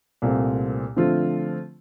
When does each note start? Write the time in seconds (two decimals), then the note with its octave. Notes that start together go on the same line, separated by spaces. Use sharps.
0.22 C2 A#2 A3 C4
0.96 D3 F3 A3 C4 F4